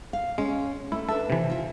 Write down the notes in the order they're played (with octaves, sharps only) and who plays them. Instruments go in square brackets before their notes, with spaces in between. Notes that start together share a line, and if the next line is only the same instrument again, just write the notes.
[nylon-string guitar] F5
[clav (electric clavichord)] G#3 [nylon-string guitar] C#4
[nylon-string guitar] A3 [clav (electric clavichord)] E4
[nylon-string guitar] D4 B4 E5 [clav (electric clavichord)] A4
[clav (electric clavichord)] C3 E3
[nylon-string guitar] E4 F4